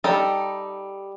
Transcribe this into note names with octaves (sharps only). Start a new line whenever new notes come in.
G3 D#4 A4